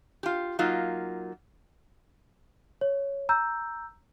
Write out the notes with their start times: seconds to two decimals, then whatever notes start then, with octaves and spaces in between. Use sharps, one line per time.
0.23 F4 G4
0.59 F#3 A#3 D#4 F4
2.81 C#5
3.29 A#5 E6 G6